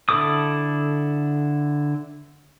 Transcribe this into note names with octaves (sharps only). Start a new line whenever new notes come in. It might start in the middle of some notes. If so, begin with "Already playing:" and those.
D3 E4 A4 D6 D#6